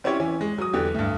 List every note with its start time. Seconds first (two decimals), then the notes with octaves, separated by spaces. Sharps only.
0.04 C4 C#4 E4 G4 C#5
0.20 E3 C#4
0.41 G#3
0.58 F#3 D#6
0.74 E2 D3 G4
0.94 D2 G2